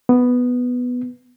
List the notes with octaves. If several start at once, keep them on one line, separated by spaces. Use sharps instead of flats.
B3